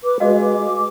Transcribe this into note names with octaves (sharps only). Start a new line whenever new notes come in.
B4 D6
G#3 F#4 D#5 F5